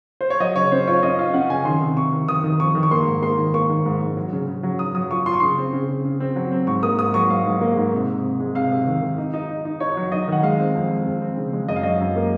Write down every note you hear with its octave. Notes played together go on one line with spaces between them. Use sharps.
C5
C#5
F#3 D#5
C#3 C#5
C#4 C5
F4 C#5
C#4 D#5
F4 F5
C#4 F#5
C#3 G#5
D#3 C6
C3
C3 C#6
D#3
D#3 D#6
D#3
F2 C#6
D#3
C#6
A#3 C6
G#2
A#3 C6
D#3
A#3 C#6
D#3
G#2
G#2
F#3
C#3
C#3
F#3
F#3 D#6
F#3 D#6
F4 C#6
F4 C6
C#6
C#3 C6
C4
C#3
C#3
C#3
C4
F#3
C4
G#2 C#6
A#3 D#6
G#2 D#6
F#3 C#6
G#2 F5
G#2
A#3
G#2
C3
C3
C3
G#3
C3 F5
C3
D#3
D#3
D#4
D#4
D#4
D#4
D#4 C#5
F#3
D#4 D#5
D#3 F#5
G#3 F5
C4
F2
G#3
F2
C4
C#3
G#3
F#2 D#5
F5
F#3 D#5
F#2
A#3